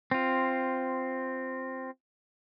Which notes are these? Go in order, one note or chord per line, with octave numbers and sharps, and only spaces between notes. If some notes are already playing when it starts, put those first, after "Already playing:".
C4 F4